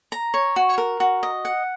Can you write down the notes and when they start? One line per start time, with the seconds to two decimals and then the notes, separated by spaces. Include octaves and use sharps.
0.12 A#5
0.34 C#5
0.56 F#4
0.78 A#4
1.00 F#4
1.23 D#5
1.45 F#5